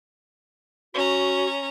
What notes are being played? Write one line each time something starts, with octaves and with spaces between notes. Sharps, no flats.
C#4 F#4 A#5